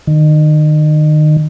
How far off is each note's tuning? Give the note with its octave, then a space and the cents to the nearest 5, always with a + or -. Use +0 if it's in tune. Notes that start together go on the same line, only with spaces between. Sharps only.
D#3 -30